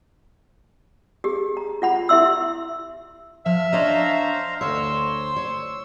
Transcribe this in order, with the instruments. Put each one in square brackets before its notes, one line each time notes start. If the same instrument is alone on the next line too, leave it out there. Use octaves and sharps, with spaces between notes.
[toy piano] G4 G#4
A#5
F4 F#5 B5
E4 G4 E5 C6 E6
[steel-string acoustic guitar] F3 [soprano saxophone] E5 [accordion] F6
[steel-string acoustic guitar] D4 C#5 D#5 [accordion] C5 F5 A#5
[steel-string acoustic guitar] D2 C3 C#5 [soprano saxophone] C5 [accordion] E6
[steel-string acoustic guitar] C#5